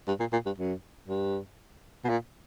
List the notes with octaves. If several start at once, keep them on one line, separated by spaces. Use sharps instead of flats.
G2
A#2
A#2
G2
F#2
G2
B2
A#2